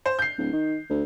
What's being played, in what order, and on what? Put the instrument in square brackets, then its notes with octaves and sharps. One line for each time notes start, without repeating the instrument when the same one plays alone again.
[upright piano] C5
G6 C7
[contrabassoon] D1
D#3
D2